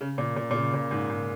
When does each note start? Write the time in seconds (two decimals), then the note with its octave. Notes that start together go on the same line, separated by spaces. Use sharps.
0.01 C#3
0.18 A#2
0.36 A#2
0.51 A#2
0.55 C#3
0.74 A#2
0.91 G#2
1.09 G#2